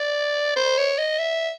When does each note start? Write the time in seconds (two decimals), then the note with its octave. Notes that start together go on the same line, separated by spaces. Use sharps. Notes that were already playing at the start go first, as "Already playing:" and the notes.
Already playing: D5
0.56 C5
0.77 C#5
0.98 D#5
1.18 E5